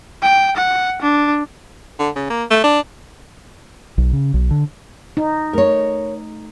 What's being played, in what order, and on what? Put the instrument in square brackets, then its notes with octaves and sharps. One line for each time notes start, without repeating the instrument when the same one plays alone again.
[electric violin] G5
F#5
D4
[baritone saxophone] D3
C#3
A#3
A3
D4
[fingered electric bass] B1
C#3
B1
D3
[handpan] D#4
[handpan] A3 [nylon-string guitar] A#4 C#5